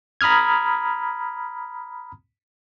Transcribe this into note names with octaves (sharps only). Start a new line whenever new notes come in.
A#5 B5 D#6 F6 G#6